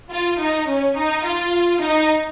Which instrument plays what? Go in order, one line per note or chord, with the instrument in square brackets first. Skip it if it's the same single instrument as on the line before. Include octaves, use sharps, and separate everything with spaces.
[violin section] F4
D#4
C#4
D#4
F4
D#4